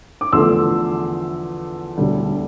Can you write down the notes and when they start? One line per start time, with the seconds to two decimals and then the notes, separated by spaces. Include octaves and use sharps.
0.21 D6
0.33 E2 D3 F3 A3 C6 E6
1.98 E1 D2 D3 G3